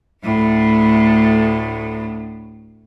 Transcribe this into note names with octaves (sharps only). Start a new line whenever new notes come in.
D2 A2